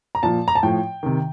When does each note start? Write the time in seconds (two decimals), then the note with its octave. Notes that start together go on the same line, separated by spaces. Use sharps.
0.15 A#5
0.23 A#2 F3 A5
0.48 A#5
0.55 A5
0.63 A2 F3 G5
1.03 C3 D#3